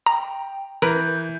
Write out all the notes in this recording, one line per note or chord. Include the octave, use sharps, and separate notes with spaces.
G5 A#5
E3 A#4 B4 G6